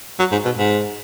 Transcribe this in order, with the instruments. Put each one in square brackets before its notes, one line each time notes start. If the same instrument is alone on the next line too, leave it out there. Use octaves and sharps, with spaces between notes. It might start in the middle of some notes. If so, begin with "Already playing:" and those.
[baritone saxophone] F#3
G#2
B2
G#2